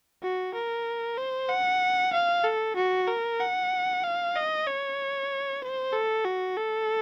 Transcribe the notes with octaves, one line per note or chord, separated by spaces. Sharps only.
F#4
A#4
C5
F#5
F5
A4
F#4
A#4
F#5
F5
D#5
C#5
C5
A4
F#4
A4